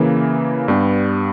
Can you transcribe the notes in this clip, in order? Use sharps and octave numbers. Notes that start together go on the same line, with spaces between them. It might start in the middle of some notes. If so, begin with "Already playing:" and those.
Already playing: C#3 E3 A#3
G2 G3 B3